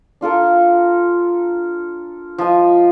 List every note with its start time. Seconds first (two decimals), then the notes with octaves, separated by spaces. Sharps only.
0.21 D4 F4 A4 A#4
2.38 F3 D#5